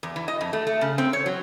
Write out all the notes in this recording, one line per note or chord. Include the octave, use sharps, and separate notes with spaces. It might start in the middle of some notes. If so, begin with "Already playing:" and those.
E2
E3
D#5
F2
A3
A3
C#3
C4
C#5
F#3